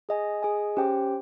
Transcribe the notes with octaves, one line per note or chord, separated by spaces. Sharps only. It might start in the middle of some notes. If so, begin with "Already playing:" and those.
G#4 D#5 G#5
G#4 D#5 G#5
C#4 G4 C5 G5